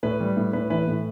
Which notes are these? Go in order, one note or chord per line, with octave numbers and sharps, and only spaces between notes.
A2 B4
G3
A2
A2 B4
E3 B4
A2